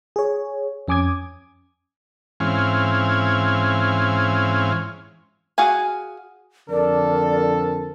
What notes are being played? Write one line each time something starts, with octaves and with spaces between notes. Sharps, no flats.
G#4 C#5
F2 C#4 G#5 D6 D#6 G#6
G#2 E3 C4 C#4 F5 G#5
F#4 G#4 F5 G#5
F2 D3 A4 A#4 D5